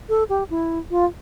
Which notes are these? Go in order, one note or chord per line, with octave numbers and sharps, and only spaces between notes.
A4
G4
E4
F4